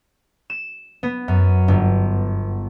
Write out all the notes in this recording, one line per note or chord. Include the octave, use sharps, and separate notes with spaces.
E7
B3
F#2
G1